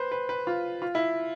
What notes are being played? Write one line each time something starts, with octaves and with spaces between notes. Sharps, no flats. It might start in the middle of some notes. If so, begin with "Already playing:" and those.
Already playing: B4 C5
B4
B4
F4
F4
E4